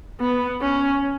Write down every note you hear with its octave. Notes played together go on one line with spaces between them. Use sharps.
B3
C#4